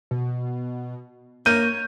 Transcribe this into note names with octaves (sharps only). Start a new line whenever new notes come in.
B2
A#3 C#5 G6 D#7